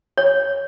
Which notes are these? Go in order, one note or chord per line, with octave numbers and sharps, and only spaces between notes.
C#5